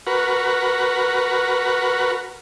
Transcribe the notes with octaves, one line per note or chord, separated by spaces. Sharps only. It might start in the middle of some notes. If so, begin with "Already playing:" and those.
F#4 A#4 B4